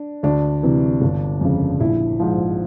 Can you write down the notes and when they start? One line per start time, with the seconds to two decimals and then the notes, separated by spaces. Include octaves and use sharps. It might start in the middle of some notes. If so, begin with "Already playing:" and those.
Already playing: D4
0.23 D2 D4
0.63 C3 E3
1.01 G1
1.41 F2 C#3
1.80 A#1 E4
2.20 G#2 F3